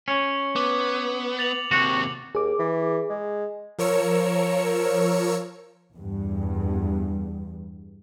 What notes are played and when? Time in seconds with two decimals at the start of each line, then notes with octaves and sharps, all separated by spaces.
0.08 C#4 C#7
0.56 B3 D6
1.39 A6 F7 F#7
1.71 D#2 C3 F#4
2.35 D#2 G#4 D6
2.59 E3
3.09 G#3
3.79 F3 A#4 C#5 E6 C#7
5.94 E2 G2